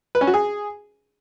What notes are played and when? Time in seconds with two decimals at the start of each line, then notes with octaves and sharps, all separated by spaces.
0.15 B4
0.21 C#4
0.27 F#4
0.34 G#4